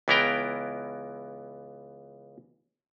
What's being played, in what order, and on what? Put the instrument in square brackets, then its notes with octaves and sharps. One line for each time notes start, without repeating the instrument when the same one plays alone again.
[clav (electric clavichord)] C#2 E3 B3 E4 A#4 G5